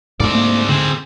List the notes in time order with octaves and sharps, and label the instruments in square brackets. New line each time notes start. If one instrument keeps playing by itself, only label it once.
[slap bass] D2 G#2 A3 [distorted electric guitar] C4 D5
[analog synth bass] A#3
[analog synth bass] D3 [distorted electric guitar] C4 G#4